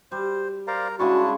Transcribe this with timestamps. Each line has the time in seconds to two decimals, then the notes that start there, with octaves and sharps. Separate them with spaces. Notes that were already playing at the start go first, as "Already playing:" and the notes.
0.12 G3 C5
0.67 A#4 C5 D5 F5 A#5
0.99 C#3 G#3 D4 E4 F#4 A5 C#6